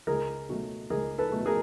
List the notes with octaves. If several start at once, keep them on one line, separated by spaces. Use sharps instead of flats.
C#2 G#4 A#4
B2 F#3 A3
C#2 G#4 A#4
A4 B4
B2 F#3 A3
G#4 A#4